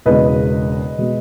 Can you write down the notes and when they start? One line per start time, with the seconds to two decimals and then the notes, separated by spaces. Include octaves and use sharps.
0.05 E1 E2 C#3 G#3 B4 D#5
0.98 B2 G#3